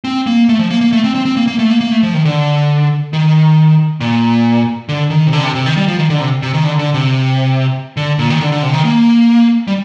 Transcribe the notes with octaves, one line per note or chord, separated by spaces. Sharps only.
C4
A#3
A3
F3
A#3
A#3
A3
C4
C4
C4
A#3
A#3
A3
A#3
A#3
A3
F3
D#3
D3
D#3
A#2
D3
D#3
C3
D3
C3
C3
D#3
G3
F3
D#3
D3
C3
C3
D#3
D3
D3
C3
D3
A#2
D#3
D3
D3
C3
D#3
A#3
G3